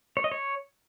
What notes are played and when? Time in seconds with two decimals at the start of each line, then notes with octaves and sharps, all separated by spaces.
0.17 C#5
0.24 D#5
0.32 C#5